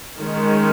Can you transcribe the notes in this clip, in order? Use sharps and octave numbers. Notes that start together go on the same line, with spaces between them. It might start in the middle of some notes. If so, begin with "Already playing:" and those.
D#3 G#3 C#4